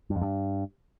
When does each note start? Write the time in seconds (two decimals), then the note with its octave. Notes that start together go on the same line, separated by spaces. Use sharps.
0.10 G2
0.16 F2
0.22 G2